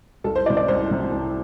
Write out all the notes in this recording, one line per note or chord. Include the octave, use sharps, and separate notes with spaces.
C2 A4
C5
C3 E3 D5
D5
C2 C5
C3 E3
C2